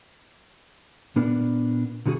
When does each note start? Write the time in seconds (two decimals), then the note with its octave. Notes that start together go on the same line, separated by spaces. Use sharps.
1.16 A#2 B3 D4 A#4
2.06 B1 D3 B3 F#4 G#4